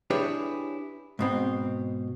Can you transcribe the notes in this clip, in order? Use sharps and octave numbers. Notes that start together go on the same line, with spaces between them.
D4 E4 G4 G#4 B4 C#5
G#2 B2 C4